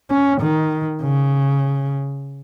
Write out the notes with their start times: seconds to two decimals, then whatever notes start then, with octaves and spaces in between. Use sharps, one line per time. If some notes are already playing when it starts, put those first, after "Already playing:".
0.11 C#4
0.41 D#3
1.03 C#3